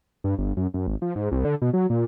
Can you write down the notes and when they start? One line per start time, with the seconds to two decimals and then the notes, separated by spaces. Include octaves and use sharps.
0.24 G2
0.38 G1
0.57 F#2
0.74 F#2
0.87 G#1
1.02 F3
1.15 G#2
1.32 C2
1.45 D3
1.62 B2
1.73 F#3
1.90 A#2